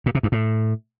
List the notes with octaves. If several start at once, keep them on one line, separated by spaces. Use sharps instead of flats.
A#2
C3
G2
A2